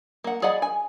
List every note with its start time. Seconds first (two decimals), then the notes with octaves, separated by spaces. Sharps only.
0.24 A#3 F#5
0.42 G#4 D5 D#5 F#5 B5
0.62 G#5